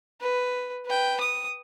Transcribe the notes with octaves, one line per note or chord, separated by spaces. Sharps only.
B4
B4 G5
D#6